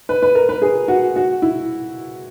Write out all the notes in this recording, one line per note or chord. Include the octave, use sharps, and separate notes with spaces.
B4
B4
A#4
B4
G#4
F#4
F#4
E4